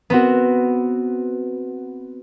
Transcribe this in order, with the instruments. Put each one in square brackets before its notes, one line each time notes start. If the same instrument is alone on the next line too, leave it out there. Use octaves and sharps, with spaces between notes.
[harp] B3 C4 F#4